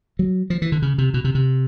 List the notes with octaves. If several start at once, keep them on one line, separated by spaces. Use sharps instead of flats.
F#3
F3
E3
D3
C#3
C3
B2
C3
C3